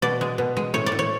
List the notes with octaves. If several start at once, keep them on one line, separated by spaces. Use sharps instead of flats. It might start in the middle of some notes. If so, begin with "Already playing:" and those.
B2 D5
G#3
B2
G#3
A2 C#5
D5
A2
C#5